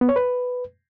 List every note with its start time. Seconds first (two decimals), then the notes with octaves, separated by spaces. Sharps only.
0.01 B3
0.09 C#5
0.16 B4